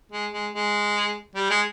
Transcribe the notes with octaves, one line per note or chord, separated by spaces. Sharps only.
G#3
G#3
G#3
G3
G#3